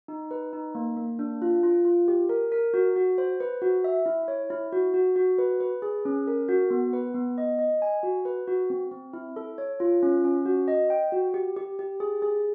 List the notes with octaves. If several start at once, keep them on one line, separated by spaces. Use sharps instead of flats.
D#4
B4
D#4
A#3
A#3
D4
F4
F4
F4
G4
A#4
A#4
F#4
F#4
C5
B4
F#4
E5
E4
C#5
E4
F#4
F#4
F#4
B4
B4
G#4
C#4
A#4
F#4
B3
B4
B3
D#5
D#5
G#5
F#4
B4
F#4
C4
C4
E4
A4
C#5
F4
C#4
C#4
F#4
D#5
G5
F#4
G4
G4
G4
G#4
G#4